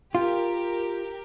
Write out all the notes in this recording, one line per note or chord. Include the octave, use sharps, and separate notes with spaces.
F4 G4 A#4